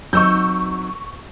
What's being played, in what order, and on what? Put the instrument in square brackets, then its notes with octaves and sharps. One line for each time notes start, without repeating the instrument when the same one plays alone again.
[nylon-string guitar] F#3 C4 D#4 [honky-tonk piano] C#6 E6 G6